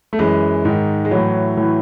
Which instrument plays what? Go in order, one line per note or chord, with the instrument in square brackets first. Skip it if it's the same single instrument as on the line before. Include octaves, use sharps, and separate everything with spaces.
[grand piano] A3
F#2 E3 G#3
G#2 D#3
G#3
A2 E3 F#3
A2 E3